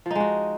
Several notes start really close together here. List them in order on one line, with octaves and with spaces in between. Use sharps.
F3 D#4 G#3 F#4